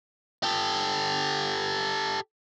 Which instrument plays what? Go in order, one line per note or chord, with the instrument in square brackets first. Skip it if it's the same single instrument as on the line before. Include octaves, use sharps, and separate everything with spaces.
[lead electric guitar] G4 A4